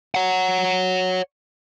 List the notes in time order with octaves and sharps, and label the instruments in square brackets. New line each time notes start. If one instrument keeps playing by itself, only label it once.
[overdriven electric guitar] C#5 F#5